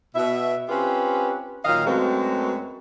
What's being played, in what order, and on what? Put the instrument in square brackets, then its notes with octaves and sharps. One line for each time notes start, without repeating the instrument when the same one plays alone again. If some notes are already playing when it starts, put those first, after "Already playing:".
[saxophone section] B2 E5
C4 C#4 F4 G4 B4
A#2 D#3 F#3 D#5 F5
F#2 F#3 G#3 A3 C4 B4